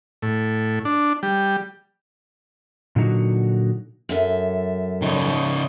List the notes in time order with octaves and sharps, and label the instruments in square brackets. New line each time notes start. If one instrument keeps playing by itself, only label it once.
[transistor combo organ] A2
D4
G3
[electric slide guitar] A#2 D3 F#3 D#4 F#4
[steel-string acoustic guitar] F#2 A4 E5
[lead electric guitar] C#3 D#4